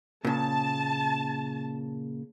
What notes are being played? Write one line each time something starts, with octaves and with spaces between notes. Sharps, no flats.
A#2 C#3 A5